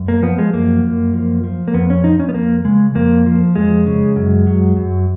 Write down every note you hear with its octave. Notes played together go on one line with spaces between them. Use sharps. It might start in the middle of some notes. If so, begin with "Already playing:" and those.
Already playing: F#2
A#3
F3 B3
G#3
F#2 A#3
F#2
F3
F3
A#3
F2 B3
C#4
F3 D#4
C#4
B3
F2 A#3
C#3 G#3
F2 A#3
F3
F2 G#3
C#3
F#2
F#3
F#2